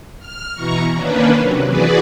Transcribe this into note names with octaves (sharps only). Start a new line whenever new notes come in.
F6
B2 E3 A#5 C#6
D#3 A#3 C#4 D4 B4
C3 F#3
E3 F#4 G#4 B4 D5